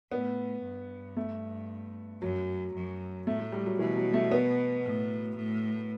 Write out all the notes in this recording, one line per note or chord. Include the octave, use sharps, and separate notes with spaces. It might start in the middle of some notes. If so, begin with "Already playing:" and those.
A2 B3
G2
A3
F#2 F#3
F#2
A2 A3
A3
G3
F#3
B2 E3
F#3
A3
B3
A2
A2